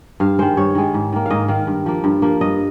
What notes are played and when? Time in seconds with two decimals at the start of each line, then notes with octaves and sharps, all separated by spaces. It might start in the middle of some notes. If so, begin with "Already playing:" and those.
0.20 G2 F5
0.38 D#3 G#3 C5
0.57 G2 C#5
0.75 D#3 G#3
0.94 G#2
1.12 D#3 A#3
1.26 G#2 D#5 F5
1.48 D#3 A#3 F5
1.67 G2
1.86 F3 A#3
2.04 G2
2.22 F3 A#3
2.41 G2 D#5